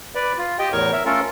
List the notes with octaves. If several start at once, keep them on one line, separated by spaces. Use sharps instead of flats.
B4 D5
F4
G4 D#5 G5
E2 A2 A#4 C#5 C#6
A#4 E5
A3 C#4 F4 A4 A#4